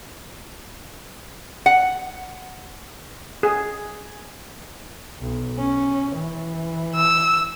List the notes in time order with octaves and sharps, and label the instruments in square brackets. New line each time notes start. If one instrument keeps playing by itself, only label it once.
[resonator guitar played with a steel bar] F#5
[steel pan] G#4
[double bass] B1
C#4
E3
[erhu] E6